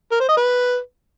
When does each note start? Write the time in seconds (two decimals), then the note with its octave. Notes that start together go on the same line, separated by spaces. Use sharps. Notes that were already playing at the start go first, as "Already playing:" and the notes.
0.12 A#4
0.20 C5
0.29 D#5
0.37 B4